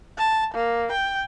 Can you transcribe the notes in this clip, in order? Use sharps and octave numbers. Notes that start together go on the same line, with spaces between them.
A5
A#3
G5